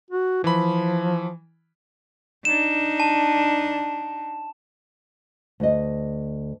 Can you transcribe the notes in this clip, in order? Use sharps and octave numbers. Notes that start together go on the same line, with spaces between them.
F#4
E3 F3 B5
D4 D#4 E7
A5
D2 D#5